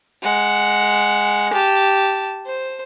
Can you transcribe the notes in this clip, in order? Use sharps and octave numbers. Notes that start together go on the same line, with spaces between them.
G#3 F#5
G4 A5
C5